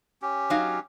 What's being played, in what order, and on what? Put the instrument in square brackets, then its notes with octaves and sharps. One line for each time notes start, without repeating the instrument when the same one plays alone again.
[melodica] C#4 G4
[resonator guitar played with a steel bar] F#3 D#4 F5